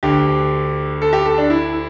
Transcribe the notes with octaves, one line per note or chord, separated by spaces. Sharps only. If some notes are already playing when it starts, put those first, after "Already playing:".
D2 D3 G4
A4
G4
A4
D4
E4